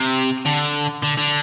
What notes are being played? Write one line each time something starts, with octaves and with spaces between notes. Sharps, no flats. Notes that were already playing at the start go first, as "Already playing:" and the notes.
Already playing: C3
D3
D3
D3